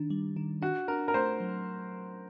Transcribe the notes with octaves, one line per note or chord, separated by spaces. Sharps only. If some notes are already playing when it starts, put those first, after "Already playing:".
Already playing: D#3 D4
G3
D#3
D4 F#4
D4 A#4
A#4
A3 C5
F#3